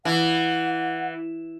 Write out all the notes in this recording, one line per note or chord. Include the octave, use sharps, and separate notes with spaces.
E3 F#5